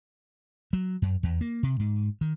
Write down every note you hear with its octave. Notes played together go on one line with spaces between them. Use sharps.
F#3
F#2
E2
A#3
C3
G#2
D#3